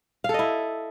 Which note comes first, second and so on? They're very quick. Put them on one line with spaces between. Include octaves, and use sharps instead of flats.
F5 A4 D#5 E4